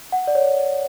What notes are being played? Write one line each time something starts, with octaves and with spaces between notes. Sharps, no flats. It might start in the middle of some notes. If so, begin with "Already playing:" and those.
F#5
D5
C#5